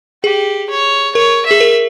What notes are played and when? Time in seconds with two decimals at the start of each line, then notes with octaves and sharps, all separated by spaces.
0.24 G4 G#4
0.70 C#5
1.15 A#4 C#5
1.46 G#4 E5
1.60 A#4